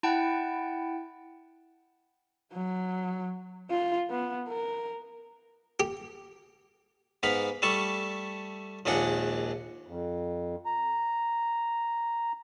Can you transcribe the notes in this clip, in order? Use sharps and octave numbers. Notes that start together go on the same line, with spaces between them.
E4 F#5 G5 A5
F#3
F4
B3
A#4
G4
G#2 B3 F5 B5
G3 A3 A5 C#6
A#1 D#2 G#3 D4 F#5
F2
A#5